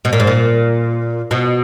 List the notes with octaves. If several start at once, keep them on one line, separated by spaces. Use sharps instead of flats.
B2
A#2
G#2
A#2
B2